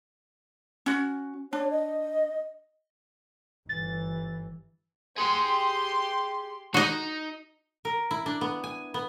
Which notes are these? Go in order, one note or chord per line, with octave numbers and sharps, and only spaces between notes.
C#4 F#4
D4 C#5
D#5
G1 E3 A6
G4 G#4 F#5 C6
D#4 F#4 D#5
A#4
E4
D4
B3
G#5
B3